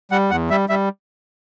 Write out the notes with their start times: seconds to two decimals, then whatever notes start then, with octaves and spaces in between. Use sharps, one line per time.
0.11 G3 F#5
0.30 E2 F#5
0.50 G3 E5
0.69 G3 E5